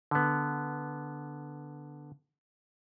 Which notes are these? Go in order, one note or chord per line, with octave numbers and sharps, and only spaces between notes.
D3 B3